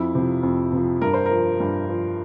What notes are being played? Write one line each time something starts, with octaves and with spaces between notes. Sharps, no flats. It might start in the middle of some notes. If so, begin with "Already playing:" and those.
Already playing: F2 E4
C3 F3
F2
C3 F3
G2 A#4
C5
F3 A#4
G2
F3